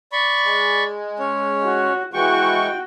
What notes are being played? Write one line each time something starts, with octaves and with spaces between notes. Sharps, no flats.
D5 B5 C#6
G#3
C#4 C#5
F#4
E3 G#3 F#4 G5 C#6